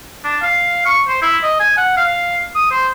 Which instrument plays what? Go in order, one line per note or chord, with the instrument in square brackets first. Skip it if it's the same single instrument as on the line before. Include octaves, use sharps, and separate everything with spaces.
[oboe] D4
F5
C#6
C5
E4
D#5
G#5
F#5
F5
D#6
C5